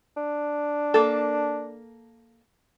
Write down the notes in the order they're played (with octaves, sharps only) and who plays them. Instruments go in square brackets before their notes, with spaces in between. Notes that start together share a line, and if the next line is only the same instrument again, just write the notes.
[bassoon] D4
[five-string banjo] A#3 A4